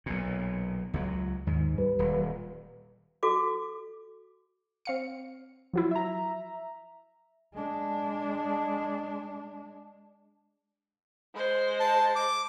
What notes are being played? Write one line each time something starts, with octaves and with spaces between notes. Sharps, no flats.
B1 A#2
C#2 F#3
D#2 G#2 D#3
G3 B4
D#1
F#4 A4 D6
C4 F5 C#7
F3 F#3 E4
E5 A#5
G#3 D4
G#3 C5
A5
D6